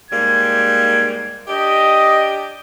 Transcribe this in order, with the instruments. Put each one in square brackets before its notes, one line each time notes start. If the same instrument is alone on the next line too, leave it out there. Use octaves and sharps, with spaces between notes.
[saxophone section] G#2 G3 A#3 [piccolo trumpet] G#6
[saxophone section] D4 G4 [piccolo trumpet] D#5